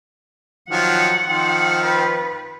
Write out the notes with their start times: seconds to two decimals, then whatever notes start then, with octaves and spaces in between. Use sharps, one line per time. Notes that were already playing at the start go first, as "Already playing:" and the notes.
0.70 D#3 F3 F#3 F#5
1.28 D#3 F3 C4
1.83 B4